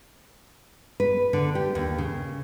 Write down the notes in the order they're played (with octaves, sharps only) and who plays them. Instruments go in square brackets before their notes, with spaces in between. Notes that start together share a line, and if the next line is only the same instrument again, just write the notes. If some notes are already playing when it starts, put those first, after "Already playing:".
[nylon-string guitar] B4
D3
G4
D#2
C#3